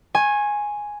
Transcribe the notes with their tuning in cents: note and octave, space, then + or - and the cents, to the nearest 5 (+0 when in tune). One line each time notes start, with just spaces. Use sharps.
G#5 +0 C#6 -35